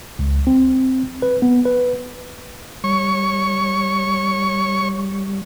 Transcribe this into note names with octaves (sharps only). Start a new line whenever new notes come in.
C#2
C4
B4
B3
B4
G3 C#5 C#6